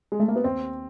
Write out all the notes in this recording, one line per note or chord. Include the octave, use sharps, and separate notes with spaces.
G#3
A3
A#3
B3
D#2 C4